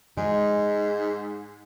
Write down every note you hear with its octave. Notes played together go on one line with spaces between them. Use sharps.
G#2 G#3